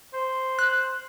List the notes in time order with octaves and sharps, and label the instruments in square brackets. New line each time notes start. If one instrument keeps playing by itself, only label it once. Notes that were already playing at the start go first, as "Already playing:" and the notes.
[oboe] C5
[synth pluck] F#6